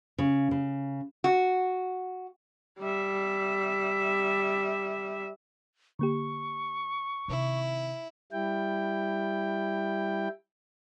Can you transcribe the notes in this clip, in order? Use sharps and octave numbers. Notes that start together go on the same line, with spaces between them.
C#3
C#3
F#4
G3 E5
D3 A#3 G4 C#6
C3 D#3 E4
G3 E4 G5